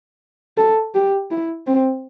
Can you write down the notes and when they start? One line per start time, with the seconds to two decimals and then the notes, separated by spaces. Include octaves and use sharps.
0.57 A4
0.95 G4
1.31 E4
1.67 C4